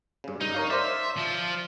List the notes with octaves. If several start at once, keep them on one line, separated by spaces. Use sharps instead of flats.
G2 C#3
G2 D#4
A#4 C#5 F5
C5 D5 E5
F3 F4